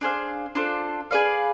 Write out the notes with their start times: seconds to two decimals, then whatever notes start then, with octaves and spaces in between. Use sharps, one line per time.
0.01 D4 G#4 C5 F5
0.55 D4 F4 A4 C5
1.11 G#4 B4 D5 F5